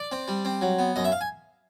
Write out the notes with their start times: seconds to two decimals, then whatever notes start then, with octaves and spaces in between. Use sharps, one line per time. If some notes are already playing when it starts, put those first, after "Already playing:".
Already playing: D5
0.12 C4
0.28 G3
0.45 C4
0.61 F#3
0.79 B3
0.96 F#2 D#5
1.04 E5
1.12 F5
1.21 G#5